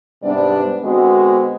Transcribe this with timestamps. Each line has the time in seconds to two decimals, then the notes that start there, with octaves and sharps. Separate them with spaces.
0.23 G#2 C3 G3 B3 D4 D5
0.84 D3 G#3 B3 C4 F#4